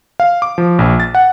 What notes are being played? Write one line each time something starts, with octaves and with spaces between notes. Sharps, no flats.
F5
D6
F3
A#1
A6
F#5